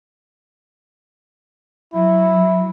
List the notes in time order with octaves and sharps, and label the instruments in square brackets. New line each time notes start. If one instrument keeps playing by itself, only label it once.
[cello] F#3 [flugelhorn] E4